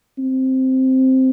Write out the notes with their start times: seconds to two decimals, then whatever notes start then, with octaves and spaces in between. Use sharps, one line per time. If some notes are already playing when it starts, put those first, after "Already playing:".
0.18 C4